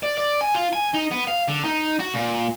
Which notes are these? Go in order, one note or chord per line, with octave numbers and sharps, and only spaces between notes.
D5
D5
G#5
F4
G#5
D#4
B3
F5
D3
D#4
F#4
A#2